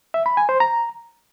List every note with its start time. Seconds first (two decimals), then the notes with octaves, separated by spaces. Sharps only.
0.14 E5
0.26 B5
0.37 G#5
0.49 C5
0.60 A#5